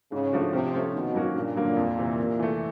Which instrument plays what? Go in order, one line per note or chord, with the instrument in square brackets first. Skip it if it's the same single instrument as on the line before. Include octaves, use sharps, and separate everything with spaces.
[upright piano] G#2 [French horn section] C#3
[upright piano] F3 A3 D4 F#4
[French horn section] C3 [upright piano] F3
[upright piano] A3 C#4 F4
[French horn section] B2 [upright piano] D#3
[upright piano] F#3 A#3 C#4 F#4
[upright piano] G2 [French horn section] A#2
[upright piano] D3 F#3 A#3
F2
C3 E3
C3
E3 A3